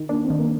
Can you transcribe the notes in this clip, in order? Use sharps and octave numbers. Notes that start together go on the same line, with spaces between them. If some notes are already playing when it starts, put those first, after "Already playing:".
Already playing: D#3
A#3 D4
C4
D#3
A#3